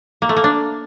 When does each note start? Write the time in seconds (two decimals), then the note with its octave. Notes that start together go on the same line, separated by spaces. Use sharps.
0.22 A#3
0.29 A3
0.37 A#3
0.44 D4